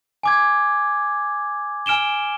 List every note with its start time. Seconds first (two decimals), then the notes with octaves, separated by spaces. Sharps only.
0.23 G#5 D6 G#6
1.86 G#5 F6 D7 E7 G7